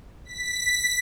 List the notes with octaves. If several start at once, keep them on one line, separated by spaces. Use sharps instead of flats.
B6